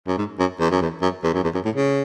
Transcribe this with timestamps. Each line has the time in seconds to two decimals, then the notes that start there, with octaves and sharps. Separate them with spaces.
0.08 F#2
0.18 G#2
0.40 F#2
0.60 E2
0.71 F#2
0.82 E2
1.02 F#2
1.24 E2
1.34 F#2
1.44 E2
1.55 F#2
1.65 A2
1.76 C#3